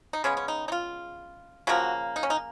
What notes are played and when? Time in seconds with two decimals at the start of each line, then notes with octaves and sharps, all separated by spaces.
0.13 D#4
0.24 C#3 G#3 B3 C#4
0.37 C#4
0.48 D#4
0.68 D#4
0.72 F4
1.67 C#3 F3 A#3 F#4
2.16 D#4
2.23 C#4
2.30 D#4